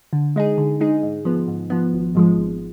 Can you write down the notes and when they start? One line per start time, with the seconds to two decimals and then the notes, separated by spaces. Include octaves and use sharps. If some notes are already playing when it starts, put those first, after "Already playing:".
0.13 D3
0.36 G#3 D#4 G#4
0.58 D3
0.81 G#3 D#4 G#4
1.03 G#2
1.25 F3 B3
1.48 G#2
1.70 F3 B3
1.93 G#1
2.15 G#2 F3 G#3
2.38 G#1